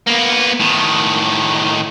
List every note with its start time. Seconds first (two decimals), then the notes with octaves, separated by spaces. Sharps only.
0.07 A#3 B3
0.60 A2 D#3